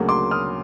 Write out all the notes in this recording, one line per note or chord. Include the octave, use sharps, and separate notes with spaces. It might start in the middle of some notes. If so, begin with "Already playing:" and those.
Already playing: D2 C#3 F#3 A#3
C6 D6
D#6 F6